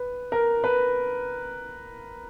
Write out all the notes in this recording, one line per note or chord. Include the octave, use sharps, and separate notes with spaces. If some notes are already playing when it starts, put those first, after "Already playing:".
Already playing: B4
A#4
B4